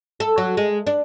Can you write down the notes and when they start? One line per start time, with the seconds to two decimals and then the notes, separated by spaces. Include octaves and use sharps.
0.20 A4
0.38 F#3
0.57 G#3
0.87 D4